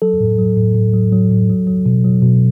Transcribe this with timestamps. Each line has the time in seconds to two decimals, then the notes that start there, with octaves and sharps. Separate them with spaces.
0.02 F#3 A4
0.20 A2
0.39 F#3
0.57 A2
0.75 A2
0.93 F#3
1.13 F#3
1.31 A2
1.50 F#3
1.67 F#3
1.86 B2
2.05 F#3
2.22 B2